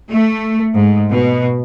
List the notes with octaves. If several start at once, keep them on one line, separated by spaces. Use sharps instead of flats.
A3
G#2
B2